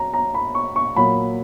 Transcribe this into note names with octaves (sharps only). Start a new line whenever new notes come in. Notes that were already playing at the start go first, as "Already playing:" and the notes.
Already playing: F#3 C#4 A#5
A#5
B5
C#6
C#6
A#2 F#3 A#3 B5